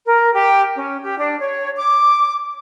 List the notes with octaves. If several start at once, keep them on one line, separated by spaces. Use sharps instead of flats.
A#4
G4
C#4
G4
D4
C#5
D6